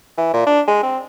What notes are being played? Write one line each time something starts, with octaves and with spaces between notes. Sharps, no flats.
E3
A#2
D4
G#3
C4